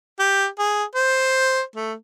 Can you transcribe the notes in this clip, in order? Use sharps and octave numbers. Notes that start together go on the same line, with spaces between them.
G4
G#4
C5
A3